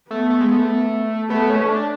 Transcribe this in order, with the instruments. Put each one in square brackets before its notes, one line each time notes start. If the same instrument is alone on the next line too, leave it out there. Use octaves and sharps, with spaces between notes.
[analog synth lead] A3 [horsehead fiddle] B3
[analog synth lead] A3
G#3
A3
[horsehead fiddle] A3 [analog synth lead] B3
[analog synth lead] C#4
D4